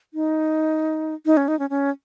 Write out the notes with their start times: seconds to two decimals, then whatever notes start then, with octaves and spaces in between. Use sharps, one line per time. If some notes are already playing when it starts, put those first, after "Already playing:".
0.14 D#4
1.26 D#4
1.37 C#4
1.48 D#4
1.59 C#4
1.70 C#4